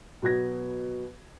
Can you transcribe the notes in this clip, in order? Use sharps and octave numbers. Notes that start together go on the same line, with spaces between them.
B2 F#3 B3 G#6 A#6